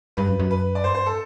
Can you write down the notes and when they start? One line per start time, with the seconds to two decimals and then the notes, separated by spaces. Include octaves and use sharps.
0.17 G2 B4
0.28 F#2
0.39 F#2
0.51 B4
0.75 D5
0.84 G2 C5
0.94 C5
1.06 A4